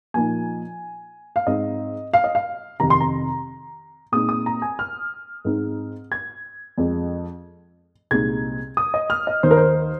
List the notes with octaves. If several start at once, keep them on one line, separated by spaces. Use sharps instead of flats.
A#2 F3 A#3 D#4 G#5
F5
G#2 G#3 C4 D#4 D#5
F5
D#5
F5
F2 C3 D#3 A#5
C6
A#5
A#2 G#3 C4 D#4 D#6
D#6
A#5
G#5
F6
G#2 G#3 C4 D#4
G#6
F2 F3 G#3 C4
C2 A#2 G#3 C4 D#4 G#6
D#6
D#5
F6
D#5
D#2 D#3 A#3 D#4 C5
A#4
C5